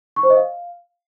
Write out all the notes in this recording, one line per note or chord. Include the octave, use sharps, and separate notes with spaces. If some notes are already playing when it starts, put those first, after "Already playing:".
C#6
C5
D#5
F5